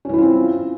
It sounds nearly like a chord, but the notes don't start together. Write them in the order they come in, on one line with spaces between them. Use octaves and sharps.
C#4 E3 E4 F4 C4